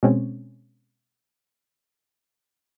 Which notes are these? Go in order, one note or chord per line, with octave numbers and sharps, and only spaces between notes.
B2 G#3 C4 C#4